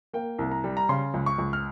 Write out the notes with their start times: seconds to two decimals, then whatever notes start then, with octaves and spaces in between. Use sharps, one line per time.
0.14 A#3 G5
0.39 C2
0.52 A#5
0.64 G3
0.77 A#5
0.89 C#3 C6
1.14 C#2
1.26 C#6
1.38 C#2
1.53 F6